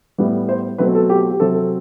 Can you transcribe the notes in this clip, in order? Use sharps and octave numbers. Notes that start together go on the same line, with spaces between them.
A2 G3 B3
C5
B2 F#3 A3 C4 B4
A4
G4
G4
C3 F#3 C4 A4
A4